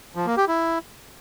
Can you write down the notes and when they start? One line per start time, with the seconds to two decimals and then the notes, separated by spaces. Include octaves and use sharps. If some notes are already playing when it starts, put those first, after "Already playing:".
0.15 F3
0.26 A#3
0.37 G4
0.48 E4